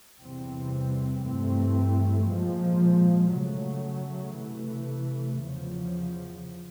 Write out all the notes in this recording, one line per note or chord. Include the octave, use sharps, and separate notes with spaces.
E2 C3 E3 G3 C4
G2 E3 A3 C4
A#2 F3 G#3
C#3 F#3 A3
C3 E3 A3
E2 C#3 F3